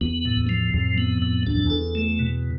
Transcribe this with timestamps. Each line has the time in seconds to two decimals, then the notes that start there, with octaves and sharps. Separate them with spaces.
0.01 E2 B3
0.25 A2
0.37 E2
0.49 F3
0.74 F2 A2
0.98 B3
1.22 A2
1.47 E2 D4
1.55 F2
1.65 E2
1.70 A4
1.95 A3
2.19 B2